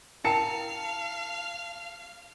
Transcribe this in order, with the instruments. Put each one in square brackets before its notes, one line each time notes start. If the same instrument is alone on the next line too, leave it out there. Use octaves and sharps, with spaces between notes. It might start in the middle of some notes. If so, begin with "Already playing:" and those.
[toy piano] E4 A#4 G5 [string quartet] F5 [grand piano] A5 C#7